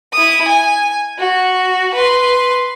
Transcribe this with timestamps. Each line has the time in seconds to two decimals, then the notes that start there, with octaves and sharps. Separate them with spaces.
0.13 E4 D#6
0.48 G#5
1.18 F#4
1.94 B4 C6